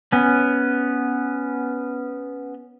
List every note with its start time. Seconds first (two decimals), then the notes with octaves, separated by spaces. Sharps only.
0.12 B3 C#4